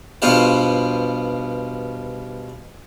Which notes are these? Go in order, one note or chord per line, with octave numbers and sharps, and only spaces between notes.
G2 B2 B3 F4 C5